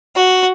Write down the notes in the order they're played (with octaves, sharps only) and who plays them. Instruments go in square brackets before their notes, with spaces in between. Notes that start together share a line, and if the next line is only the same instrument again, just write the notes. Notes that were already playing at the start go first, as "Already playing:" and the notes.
[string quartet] F#4